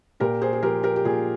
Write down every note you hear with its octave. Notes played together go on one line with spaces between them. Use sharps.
A#2 G4 A#4
G#4 C5
G#4
F3 G4 A#4
G4 A#4
G4
A#2 F4 G#4